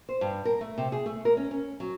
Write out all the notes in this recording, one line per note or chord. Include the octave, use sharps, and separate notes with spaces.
C5
G2
A#4
A3
C3
G#4
A3
A#4
C#4
C#4
F#3